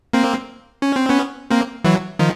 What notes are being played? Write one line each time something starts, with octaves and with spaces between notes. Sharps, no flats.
A#3 C4
C#4
C4
B3 C#4
A#3 C4
E3 F#3
D#3 F3